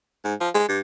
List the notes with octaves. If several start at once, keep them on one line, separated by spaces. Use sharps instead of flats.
G#2
F3
G#3
G2